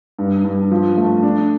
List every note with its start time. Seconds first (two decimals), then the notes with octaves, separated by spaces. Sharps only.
0.19 G2
0.44 G2
0.71 F3
0.97 A3
1.23 D4